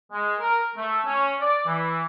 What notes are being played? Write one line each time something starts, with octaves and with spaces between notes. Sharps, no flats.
G#3
A#4
A3
C#4
D5
E3